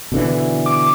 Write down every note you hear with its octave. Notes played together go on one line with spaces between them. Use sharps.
B2 D3 E3
D6